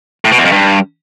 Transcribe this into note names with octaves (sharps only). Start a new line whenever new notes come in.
A2
B2
E2
F2
G2